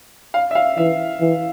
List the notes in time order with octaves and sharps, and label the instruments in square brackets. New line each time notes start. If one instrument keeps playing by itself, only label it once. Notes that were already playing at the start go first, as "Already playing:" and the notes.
[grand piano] F5
E5
F5
[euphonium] E3 [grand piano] E5
[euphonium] E3